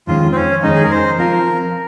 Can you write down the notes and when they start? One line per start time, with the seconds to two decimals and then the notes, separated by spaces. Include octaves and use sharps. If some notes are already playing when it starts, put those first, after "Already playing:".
0.07 F2 D#3 G#3 C#4 F4
0.31 C4
0.35 C#4
0.63 F2 D#3 G#3 C#4 D#4
0.75 G#4
0.83 A#4
0.91 C5
1.18 F3 C4 F4 A#4